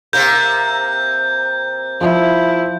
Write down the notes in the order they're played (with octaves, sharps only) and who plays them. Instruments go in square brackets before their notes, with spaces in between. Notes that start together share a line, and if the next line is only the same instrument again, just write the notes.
[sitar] C3 A#3 A#4 [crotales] G6
[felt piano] F3 [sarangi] E4